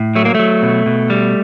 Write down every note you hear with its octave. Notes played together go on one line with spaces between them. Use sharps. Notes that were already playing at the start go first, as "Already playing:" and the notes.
Already playing: A2
F#3 A3
A#3
F#3 A3
B2
B2
G3